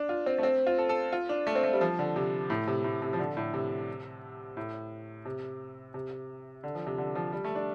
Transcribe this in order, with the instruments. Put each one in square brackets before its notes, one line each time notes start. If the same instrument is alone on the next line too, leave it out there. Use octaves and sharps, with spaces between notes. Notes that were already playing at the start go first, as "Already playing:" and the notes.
Already playing: [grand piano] D4
F4
C4
A3
C4
F4
A4
A4
F4
D4
A3
C4
A3
G3
F3
D3
C3
A2
C3
A2
C3
F3
D3
A2
C3
A2
C3
C3
D3
F3
C3
D3
F3
G3
A3
D4